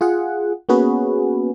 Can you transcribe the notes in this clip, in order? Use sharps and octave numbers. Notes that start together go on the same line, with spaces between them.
F4 G#4 F#5
A#3 B3 C#4 F#4 G#4 B4